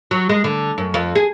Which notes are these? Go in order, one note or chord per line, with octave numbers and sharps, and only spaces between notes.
F#3
G#3
D3
F#2
F2
G#4